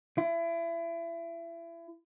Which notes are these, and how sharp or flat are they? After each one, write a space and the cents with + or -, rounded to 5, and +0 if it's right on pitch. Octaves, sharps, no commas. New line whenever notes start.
E4 +30